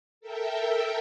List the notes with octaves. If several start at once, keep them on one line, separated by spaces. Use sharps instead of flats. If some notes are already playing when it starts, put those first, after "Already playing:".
A4 A#4 E5 G5